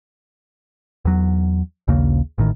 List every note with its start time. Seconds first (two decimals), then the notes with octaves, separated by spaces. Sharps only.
1.05 E2 F#3
1.88 A#1 D#2 C#3 A#3
2.38 A1 A2 D#3